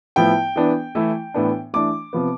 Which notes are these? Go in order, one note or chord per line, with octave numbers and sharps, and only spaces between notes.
A2 F3 B3 E4 G5
E3 B3 D4
E3 A3 E4
A2 E3 B3 D4
E3 A3 D4 D6
C3 F3 B3